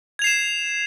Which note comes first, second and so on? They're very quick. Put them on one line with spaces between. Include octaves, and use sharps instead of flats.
G#6 F7 C7 E7